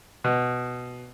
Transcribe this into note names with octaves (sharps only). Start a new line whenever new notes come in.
B2